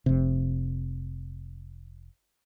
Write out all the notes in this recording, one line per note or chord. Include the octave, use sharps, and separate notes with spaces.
F1 C3